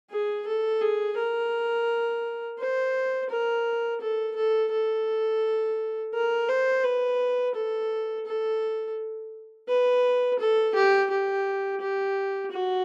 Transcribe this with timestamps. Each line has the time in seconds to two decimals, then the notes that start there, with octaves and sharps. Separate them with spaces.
0.11 G#4
0.47 A4
0.81 G#4
1.17 A#4
2.59 C5
3.30 A#4
4.01 A4
4.36 A4
4.72 A4
6.14 A#4
6.49 C5
6.84 B4
7.55 A4
8.26 A4
9.69 B4
10.39 A4
10.75 G4
11.10 G4
11.81 G4
12.51 F#4